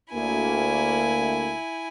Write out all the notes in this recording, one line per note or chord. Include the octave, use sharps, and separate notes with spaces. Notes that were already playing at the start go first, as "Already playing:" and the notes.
D2 A#3 E4 G#5